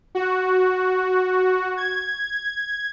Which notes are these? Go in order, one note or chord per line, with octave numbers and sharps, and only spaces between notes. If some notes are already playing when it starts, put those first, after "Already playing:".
F#4
G#6